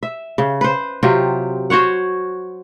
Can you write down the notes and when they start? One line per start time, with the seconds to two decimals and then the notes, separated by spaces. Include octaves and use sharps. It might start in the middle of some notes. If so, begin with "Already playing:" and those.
0.03 E5
0.38 C#3
0.61 B4 C5
1.03 C3 F#3 F4 G4
1.70 F#4 C5 C#5 F#5